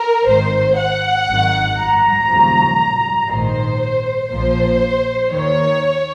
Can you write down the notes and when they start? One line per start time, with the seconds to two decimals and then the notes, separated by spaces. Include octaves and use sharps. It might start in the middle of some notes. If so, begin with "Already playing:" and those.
Already playing: A#4
0.27 G#1 G#2 D#3 C5
0.77 F#5
1.28 G#1 F#2 D#3
1.78 A#5
2.28 D#2 C#3 F3
3.30 A#1 G#2 D#3 C5
4.30 A#1 A#2 F3 C5
5.31 D#2 D#3 C#5